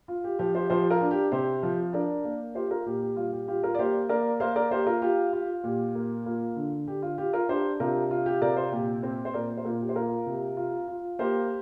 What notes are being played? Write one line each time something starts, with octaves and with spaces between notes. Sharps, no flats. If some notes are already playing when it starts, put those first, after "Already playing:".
F4
G4
F3 G4
G4 C5
F3 G4 C5
F4 A#4
D4
G4
C3 G4 C5
F3
D4 A#4 D5
A#3
F4 G4 C5
F4 A#4
A#2 G4
G4
G3 F4
G4
F4 G4
F4 A#4
D5
A#3 G4 C5
A#3 A#4 D5
A#3 C5 F5
A#4 D5
A#3 G4 C5
F4 A#4
F4 G4
F4
A#2 G4
A#3
A#3 F4
D3
D3 G4
F4
F4 G4
F4 A#4
D4 G4 C5
C3 F4 A#4
F4
G4
C3 A#4 D5
G4 C5
A#2 G4
C4
C5
A#2 A#4 D5
C5
A#2 F4 A#4
G4
C5
A#3 F4 A#4
C3
F4
F4
A#3 G4 C5